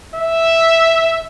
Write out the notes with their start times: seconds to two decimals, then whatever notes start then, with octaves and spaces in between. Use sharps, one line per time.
0.15 E5